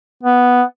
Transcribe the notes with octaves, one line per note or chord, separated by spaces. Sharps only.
B3